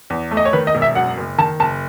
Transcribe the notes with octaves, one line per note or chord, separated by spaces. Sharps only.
E2
A3
D#5
C#5
D#3 B4
D#5
E1
E5
F#2 F#5
F#1
D#3 A5
F#1 A5